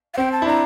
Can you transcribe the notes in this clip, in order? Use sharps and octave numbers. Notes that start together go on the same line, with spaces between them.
F5
C4 G5
A5
E4
D4 A#5